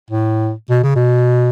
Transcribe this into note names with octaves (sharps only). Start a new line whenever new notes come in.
A2
B2
C#3
B2